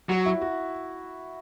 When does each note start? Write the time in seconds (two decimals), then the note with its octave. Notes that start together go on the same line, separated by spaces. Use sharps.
0.09 F#3 F#4
0.26 E4
0.42 F#4